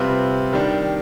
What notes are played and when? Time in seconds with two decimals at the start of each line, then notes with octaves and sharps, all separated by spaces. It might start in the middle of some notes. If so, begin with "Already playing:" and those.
Already playing: C3 G3 C4 F4 B4
0.53 D#3 G3 D4